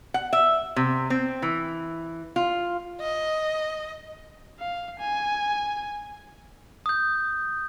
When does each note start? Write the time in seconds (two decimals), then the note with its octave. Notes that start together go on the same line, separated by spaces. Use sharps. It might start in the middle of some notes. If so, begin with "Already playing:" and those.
0.14 F#5
0.33 E5
0.76 C3
1.10 C4
1.42 E3
2.36 F4
3.01 D#5
4.60 F5
5.00 G#5
6.86 D#6 G6